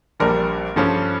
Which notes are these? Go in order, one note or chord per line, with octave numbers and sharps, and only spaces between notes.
A#1 A#2 G3 D4 A#4
G2 F3 C#4 A4